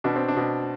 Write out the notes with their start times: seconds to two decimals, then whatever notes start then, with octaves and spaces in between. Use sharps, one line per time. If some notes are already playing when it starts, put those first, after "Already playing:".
0.04 B2 D4
0.16 C4
0.28 D4
0.37 B2